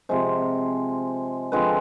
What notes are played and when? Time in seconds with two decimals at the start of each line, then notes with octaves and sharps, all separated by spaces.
0.09 C3 F3 G#3 C5
1.52 D3 F3 G#3 C4 B4